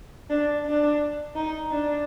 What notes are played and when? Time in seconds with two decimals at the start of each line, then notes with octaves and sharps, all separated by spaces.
0.30 D4
0.66 D4
1.35 D#4
1.72 D4